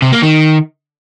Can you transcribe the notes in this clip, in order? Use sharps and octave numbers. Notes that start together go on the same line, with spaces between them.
C3
A#3
D#3